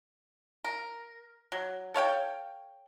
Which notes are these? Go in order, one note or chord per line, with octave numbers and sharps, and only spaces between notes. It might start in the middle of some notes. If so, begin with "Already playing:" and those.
A#4
F#3
A4 C#5 F5 G5